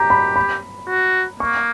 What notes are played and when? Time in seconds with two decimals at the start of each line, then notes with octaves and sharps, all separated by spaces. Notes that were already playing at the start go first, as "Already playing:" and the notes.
Already playing: G4 A#5
0.10 B5
0.36 B5
0.89 F#4
1.40 A#3 C#6